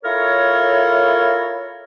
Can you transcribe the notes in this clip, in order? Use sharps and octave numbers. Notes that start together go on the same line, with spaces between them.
E4 F4 A4 A#4 C#5